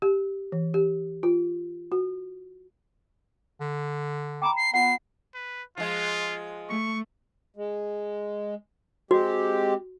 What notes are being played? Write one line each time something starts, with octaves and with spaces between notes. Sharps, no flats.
G4
E3
G4
F4
F#4
D3
G5 A#5 B5 D6
C7
B3 F4 F#5 C7
B4
F3 G#3 F4
A3 C#6
G#3
G#3 C4 F#4 G4